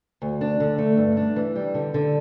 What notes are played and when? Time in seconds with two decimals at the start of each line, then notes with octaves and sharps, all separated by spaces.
0.22 D2
0.41 D4
0.60 D3
0.78 A3
0.97 G2
1.17 D4
1.36 E3
1.56 G3
1.74 D3
1.94 D3